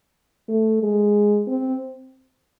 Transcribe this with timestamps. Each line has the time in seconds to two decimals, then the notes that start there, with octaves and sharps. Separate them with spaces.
0.48 A3
0.82 G#3
1.47 C4